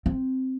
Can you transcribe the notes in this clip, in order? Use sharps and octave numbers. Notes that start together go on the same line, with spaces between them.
C4